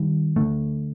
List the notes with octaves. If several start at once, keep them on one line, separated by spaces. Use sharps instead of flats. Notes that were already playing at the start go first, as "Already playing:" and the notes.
Already playing: D#3 G3
D3 A3